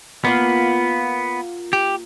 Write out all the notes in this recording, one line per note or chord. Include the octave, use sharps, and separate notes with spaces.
A#3 B3 F4 F#5
G4